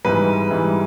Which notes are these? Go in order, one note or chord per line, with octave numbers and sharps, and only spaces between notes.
G#2 E3 G3 B4
G#2 E3 G3